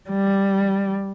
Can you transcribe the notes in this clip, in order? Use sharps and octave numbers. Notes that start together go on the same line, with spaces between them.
G3